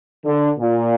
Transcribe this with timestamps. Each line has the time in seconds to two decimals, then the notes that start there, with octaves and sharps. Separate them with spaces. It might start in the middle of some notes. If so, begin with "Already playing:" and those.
0.25 D3
0.59 A#2